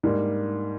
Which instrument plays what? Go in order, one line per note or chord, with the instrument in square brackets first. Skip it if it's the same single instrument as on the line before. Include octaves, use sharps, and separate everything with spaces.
[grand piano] G#2 G3 A#3